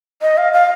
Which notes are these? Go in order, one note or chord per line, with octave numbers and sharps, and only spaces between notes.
D#5
F5
F5